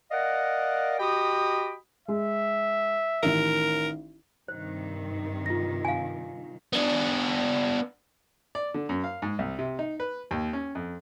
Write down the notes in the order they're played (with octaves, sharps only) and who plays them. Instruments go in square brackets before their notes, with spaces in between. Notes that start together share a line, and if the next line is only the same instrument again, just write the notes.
[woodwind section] A#4 D5 D#5 F5 F#5
F#4 G4 D#5 G5 B5 D#6
[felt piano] G#3 [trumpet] E5
[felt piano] A1 D#3 [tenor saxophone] A#4
[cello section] G2 C3 D#3 [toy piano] C5
[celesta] F4 A#6
[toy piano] F5 G#5
[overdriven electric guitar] B3 D4
[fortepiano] D5
D3
F#2
F5
G#2
C2
C3
D#4
B4
D#2
C#4
F2